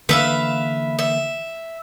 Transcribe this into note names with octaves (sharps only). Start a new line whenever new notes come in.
D3 E3 A#3 B4 E5 F5
E5